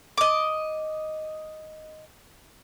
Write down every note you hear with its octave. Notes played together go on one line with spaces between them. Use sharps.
D#5 D6